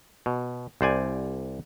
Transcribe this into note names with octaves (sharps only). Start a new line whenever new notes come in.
B2
C2 C5 D5 G#5